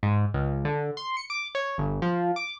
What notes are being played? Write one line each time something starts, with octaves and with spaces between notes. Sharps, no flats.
G#2
C#2
D3
C6
C#7
D6
C#5
G1
F3
D6